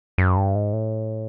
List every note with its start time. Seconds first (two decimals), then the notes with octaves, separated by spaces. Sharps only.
0.18 F#2
0.37 G2
0.55 G#2
0.73 A2